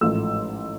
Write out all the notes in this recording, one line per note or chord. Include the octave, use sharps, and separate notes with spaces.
A1 G#2 F3 A3 E6